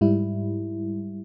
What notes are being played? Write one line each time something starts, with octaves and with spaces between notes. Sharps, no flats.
G#2 G3 E4